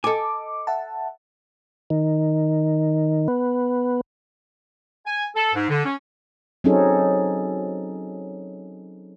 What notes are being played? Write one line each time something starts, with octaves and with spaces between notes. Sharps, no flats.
A4 D#5 G#5 D6
E5 F#5 A5
D#3
B3
G#5
A4
G#2
D3
C#4
F#3 C4 C#4 D#4 G#4 A4